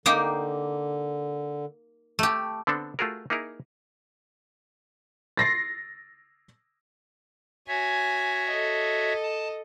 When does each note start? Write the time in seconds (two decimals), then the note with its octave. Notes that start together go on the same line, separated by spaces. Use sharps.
0.06 D3 A#3 D#4 G4
2.19 A3 G4
2.67 D3 B3 C4 D4 A4
2.99 A3 F4 F#4 G#4 A#4
3.30 A#3 D#4 E4 G#4 A#4
5.37 A6 A#6 C7
7.68 F#4 C#5 E5 G#5
8.50 A4 D#5
9.22 A5